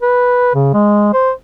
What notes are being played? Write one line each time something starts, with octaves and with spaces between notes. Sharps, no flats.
B4
C#3
G#3
C5